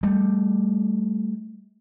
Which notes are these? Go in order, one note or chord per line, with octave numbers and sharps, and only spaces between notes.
G3 A3